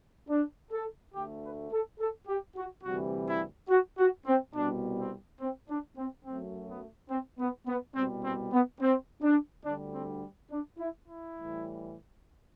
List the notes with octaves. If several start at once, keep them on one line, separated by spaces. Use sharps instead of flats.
D4
A4
D2 D3 A3 G4
B4
A4
A4
G4
F#4
D2 C3 E3 G3 F#4
E4
F#4
F#4
C4
C2 B2 G3 D4
C4
C4
D4
C4
F#2 F#3 A3 C4
B3
C4
B3
B3
C2 B2 G3 C4
C4
B3
C4
D4
D2 D3 G3 D4
C4
D4
E4
E4
A2 E3 G3